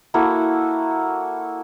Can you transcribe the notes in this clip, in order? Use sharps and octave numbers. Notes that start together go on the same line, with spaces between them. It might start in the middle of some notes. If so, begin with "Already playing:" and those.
A#3 E4 F#4 A4